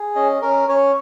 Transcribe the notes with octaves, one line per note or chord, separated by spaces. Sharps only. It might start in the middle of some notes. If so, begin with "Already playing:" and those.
Already playing: G#4
C#4 D#5
C#4 A#4
C#4 C#5